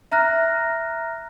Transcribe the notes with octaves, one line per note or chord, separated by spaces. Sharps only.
E5 A#5 F6 F#6 A#6